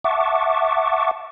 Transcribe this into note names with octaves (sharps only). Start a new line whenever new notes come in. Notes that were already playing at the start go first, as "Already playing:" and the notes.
E5 F#5 A5 C#6 D6